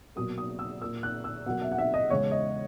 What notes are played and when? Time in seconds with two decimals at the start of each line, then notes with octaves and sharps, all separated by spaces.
0.16 B2 F#3 A#3 D#6
0.38 D#6
0.59 E6
0.81 A#2 A#3 E6
1.03 F#6
1.24 E6
1.46 B2 F#3 A#3 F#5
1.62 E5
1.72 F#5
1.78 E5
1.94 D#5
2.10 E2 C#3 G#3 C#5
2.31 D#5